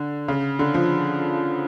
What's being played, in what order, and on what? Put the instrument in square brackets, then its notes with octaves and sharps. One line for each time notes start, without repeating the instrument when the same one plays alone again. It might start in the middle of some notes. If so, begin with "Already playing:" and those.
Already playing: [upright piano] D3
C#3
D3
F3